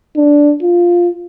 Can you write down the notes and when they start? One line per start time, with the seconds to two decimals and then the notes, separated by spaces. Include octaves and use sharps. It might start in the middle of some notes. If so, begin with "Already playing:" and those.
0.16 D4
0.62 F4